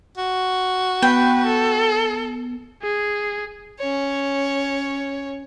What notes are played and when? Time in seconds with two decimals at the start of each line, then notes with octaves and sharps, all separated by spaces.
0.18 F#4
1.02 B3 B4 G5
1.46 A4
2.83 G#4
3.79 C#4 C#5